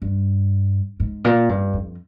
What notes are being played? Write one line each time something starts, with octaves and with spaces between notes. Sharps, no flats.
G2
G#2
A#2
G2
F2